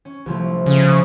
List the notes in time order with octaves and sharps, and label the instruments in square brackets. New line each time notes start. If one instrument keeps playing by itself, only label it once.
[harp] C#4
C2 F3 A3
[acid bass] C#3